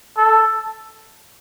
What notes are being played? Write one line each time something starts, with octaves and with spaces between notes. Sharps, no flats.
A4